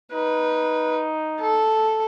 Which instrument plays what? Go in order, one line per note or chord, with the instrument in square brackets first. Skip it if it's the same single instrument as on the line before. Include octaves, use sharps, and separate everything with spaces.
[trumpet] D#4 [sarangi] B4
[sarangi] A4